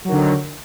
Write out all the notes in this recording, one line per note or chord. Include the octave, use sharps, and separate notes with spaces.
D3 D#3 F#3